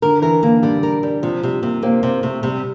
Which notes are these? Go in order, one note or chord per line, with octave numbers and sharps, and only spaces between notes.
D3 A#4
E3 A#4
D3 A#3
D3 G3
A#4
G3
C3 F3
C3 G3
C3 A#3
A#3 C4
C3 C4
C3 A3
C3 G3